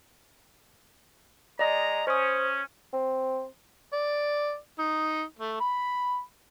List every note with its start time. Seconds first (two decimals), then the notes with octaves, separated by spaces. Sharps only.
1.59 G#3 D5 D#5 A#5
2.07 C#4 C5 D#6
2.93 C4
3.93 D5
4.79 D#4
5.39 A3
5.60 B5